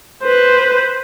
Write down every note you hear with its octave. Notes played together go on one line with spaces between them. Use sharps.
B4 C5